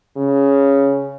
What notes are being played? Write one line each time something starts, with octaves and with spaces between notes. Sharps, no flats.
C#3